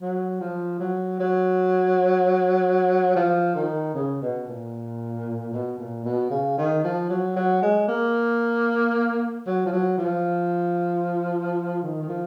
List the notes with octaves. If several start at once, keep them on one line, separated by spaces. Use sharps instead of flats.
F#3
F3
F#3
F#3
F3
D#3
C#3
B2
A#2
B2
A#2
B2
C#3
D#3
F3
F#3
F#3
G#3
A#3
F#3
F3
F#3
F3
D#3
D#3
F3